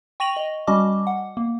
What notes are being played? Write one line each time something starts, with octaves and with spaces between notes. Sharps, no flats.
G5 C#6 A#6 D#7 F7 F#7
D#5
G3 C#4 F#4 D#5 A5 D6
F#5
A#3